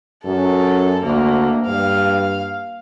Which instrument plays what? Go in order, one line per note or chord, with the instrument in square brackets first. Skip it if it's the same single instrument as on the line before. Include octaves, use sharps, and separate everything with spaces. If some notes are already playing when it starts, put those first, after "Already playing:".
[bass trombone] F#2 [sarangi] A4
[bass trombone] D2 [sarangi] A#3
[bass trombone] G2 [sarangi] F5